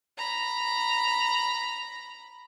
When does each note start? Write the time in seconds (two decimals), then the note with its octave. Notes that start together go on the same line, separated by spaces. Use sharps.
0.17 A#5 B5